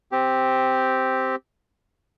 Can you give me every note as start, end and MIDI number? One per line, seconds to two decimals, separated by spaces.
0.12 1.35 60
0.12 1.35 67